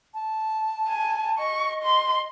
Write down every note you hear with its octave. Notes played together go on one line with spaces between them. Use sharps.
A5
G#5
D#5 C#6
C6